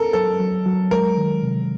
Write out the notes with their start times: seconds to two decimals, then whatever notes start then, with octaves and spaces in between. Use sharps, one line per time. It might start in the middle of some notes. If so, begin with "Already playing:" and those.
Already playing: A4 A#4
0.13 F#3 A4
0.40 F#3
0.66 F#3
0.91 G#3 A#4
1.17 D#3
1.43 C3